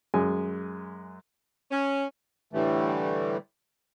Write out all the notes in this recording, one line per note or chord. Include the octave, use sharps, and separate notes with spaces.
F#2 G#3 G#5
C#4
A2 D3 E3 G3 A3